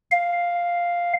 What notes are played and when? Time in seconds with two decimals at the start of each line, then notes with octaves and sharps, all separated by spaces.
0.11 F5